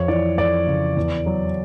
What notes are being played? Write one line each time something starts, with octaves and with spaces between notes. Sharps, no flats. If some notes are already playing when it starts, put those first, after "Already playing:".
Already playing: F2 C#5
E3 D5
F2 D5
C#3
E2
F#3